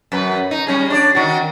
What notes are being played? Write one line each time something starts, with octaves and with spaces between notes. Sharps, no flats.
F#2 B4
D#4
G3 C#4 G#4
D4 D5
D#3 F#4